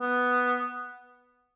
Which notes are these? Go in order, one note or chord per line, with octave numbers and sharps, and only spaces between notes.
B3